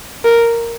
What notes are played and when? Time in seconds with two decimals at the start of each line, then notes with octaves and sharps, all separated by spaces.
0.25 A#4